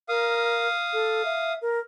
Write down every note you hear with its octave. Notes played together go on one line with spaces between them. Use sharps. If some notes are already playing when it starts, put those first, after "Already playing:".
A#4 F5 D#6
A4
E5
A#4